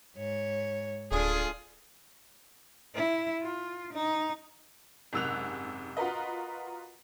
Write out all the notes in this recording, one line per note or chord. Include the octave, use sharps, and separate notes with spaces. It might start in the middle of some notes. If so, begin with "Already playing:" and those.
G#2 C#5
D1 A3 D4 F4 G#4
E4
F4
D#4
F#1 G#2 C3 E6 F#6 F7
F4 F#4 A#4 B4 D#5